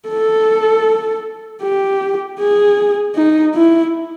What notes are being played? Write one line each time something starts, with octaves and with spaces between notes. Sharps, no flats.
A4
G4
G#4
D#4
E4